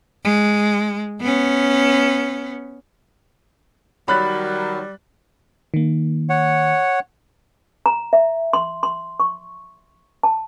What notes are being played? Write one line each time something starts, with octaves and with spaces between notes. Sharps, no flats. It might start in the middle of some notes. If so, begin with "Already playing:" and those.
G#3
B3 C#4
D#3 F#3 G3 B5 F#6 A6
D#3 A#3
C#5 F#5
A#5
E5
C6
C6
C#6
A5